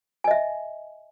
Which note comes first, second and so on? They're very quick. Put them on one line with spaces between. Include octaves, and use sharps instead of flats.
G#5 D#5 E5